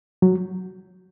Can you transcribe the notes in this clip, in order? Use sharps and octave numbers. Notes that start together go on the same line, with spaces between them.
F#3